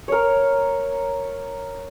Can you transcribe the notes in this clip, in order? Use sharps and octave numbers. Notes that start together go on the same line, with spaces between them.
A#4 C#5